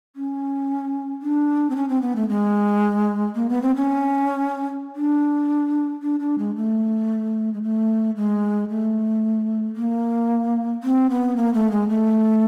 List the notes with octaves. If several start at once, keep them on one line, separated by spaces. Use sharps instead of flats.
C#4
D4
C4
C#4
C4
B3
A3
G#3
A#3
B3
C4
C#4
D4
D4
D4
G#3
A3
G#3
A3
G#3
A3
A#3
C4
B3
A#3
A3
G#3
A3